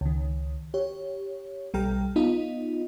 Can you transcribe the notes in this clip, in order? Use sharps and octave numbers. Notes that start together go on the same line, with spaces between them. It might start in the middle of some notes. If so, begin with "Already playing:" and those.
C#2 D#3
G4 C#5
B1 G3 A4 G5 A#5 F6
B3 D#4 F4 D#5